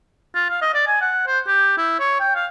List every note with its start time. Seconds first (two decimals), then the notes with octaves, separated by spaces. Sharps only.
0.35 F4
0.50 F5
0.61 D#5
0.74 D5
0.87 G#5
1.01 F#5
1.27 C5
1.47 G4
1.77 E4
2.00 C#5
2.20 G5
2.35 F5